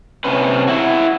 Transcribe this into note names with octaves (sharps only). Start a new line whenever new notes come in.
C3 C#4 B4
E4 F#4